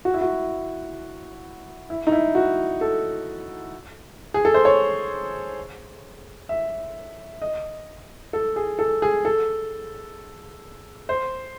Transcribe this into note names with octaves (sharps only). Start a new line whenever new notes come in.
F#4
E4
F#4
E4
D#4
E4
F#4
A4
G#4
A4
C5
C#5
E5
D#5
A4
G#4
A4
G#4
A4
C5